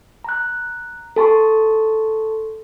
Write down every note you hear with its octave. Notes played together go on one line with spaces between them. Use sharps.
A#5 F#6
A4 A5 C6 C#6